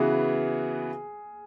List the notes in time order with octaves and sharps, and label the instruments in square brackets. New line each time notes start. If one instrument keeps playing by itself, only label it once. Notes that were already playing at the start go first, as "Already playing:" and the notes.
Already playing: [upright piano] C#3 E3 B3 F#4 [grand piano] G#4